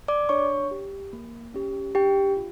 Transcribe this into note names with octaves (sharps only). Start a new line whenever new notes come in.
D5 D6
D4 C#5 C#6
G4
A#3
C#4 G4
D4 G4 G5
F4